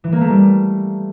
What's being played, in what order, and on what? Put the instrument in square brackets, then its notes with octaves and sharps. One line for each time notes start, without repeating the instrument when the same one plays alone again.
[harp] E3
A#3
A3
G3